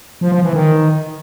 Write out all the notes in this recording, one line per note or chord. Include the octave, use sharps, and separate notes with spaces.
F3
F3
E3
D#3